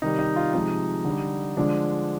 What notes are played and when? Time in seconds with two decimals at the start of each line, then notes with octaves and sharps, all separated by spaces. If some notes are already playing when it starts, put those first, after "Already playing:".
0.02 C3 D#3 G3 D#4
0.19 D#4
0.36 F4
0.54 C3 F3 G#3 D#4
1.05 D3
1.10 G3
1.57 D3 F3 G#3 D4